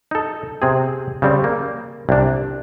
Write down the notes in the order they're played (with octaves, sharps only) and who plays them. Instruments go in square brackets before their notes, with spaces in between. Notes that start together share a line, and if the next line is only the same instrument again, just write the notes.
[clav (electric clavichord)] D#4 A4
C3 C4 G#4
C#3 G3 C4
A#3
C2 D4